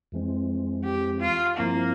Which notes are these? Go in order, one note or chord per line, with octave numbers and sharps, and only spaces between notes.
F2 E3 G#3 C4
G4
F4
G2 F3 A#3 C4 E4